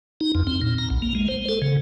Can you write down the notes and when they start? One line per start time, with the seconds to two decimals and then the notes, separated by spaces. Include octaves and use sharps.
0.21 D#4
0.35 F2
0.47 C4
0.62 A#2
0.78 A#5
0.90 B1
1.02 A#3
1.15 G#3
1.28 C5
1.49 A4
1.62 C#3